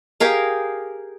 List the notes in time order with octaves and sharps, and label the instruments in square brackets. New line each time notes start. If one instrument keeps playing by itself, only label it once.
[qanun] G4 G#4 A#4 F5